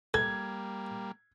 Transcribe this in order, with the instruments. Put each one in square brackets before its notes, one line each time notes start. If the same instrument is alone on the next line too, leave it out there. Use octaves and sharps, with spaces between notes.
[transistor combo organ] G3 A#3 [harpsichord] A4 [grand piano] G#6